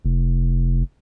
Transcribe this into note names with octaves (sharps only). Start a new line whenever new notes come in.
F1